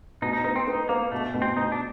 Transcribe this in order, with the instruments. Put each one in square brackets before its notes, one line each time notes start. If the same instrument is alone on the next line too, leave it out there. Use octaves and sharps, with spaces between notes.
[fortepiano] B2 [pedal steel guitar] D#4
[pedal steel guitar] D#4
[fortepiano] B3 [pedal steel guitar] D#4
[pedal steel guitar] C4
[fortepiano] B3 [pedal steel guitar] D#4
[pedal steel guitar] A#3 [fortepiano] B3
[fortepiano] B2 [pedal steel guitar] A3
[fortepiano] B2
[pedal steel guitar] C4
[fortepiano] B2 [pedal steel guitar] D#4
[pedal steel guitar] D4